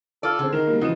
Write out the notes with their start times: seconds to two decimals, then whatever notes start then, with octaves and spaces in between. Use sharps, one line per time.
0.23 F4 A4 D5
0.39 D3 C4 G#4
0.52 D#3 D#4 A#4 E7
0.67 G3 A#3
0.81 C#3 E3 F3 F#4 D#5 E7